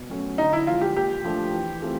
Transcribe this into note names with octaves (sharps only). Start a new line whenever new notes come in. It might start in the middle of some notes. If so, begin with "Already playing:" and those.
Already playing: B2
F#3 A3 C#4
D3 D#4
E4
F3 G#3 F4
G4
A#2 G4
F3 A3 D4 F4
E3
A3 C4 F4 G#4